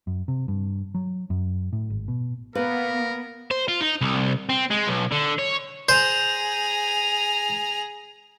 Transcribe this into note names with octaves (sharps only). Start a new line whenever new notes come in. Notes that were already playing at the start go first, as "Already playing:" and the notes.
F#2
C3
G2
F#3
F#2
A2
G#1
B2
A#3 B3 A#4 B4
C5
F4
D#4
C2
C4
G#3
B1
D3
C#5
G#4 C5 A#5